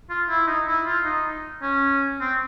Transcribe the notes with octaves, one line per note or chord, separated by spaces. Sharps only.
F4
E4
D#4
E4
F4
D#4
C#4
C4